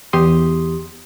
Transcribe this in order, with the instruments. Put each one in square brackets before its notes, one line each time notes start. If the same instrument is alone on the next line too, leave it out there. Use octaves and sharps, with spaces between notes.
[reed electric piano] E2 G4 C6 D#6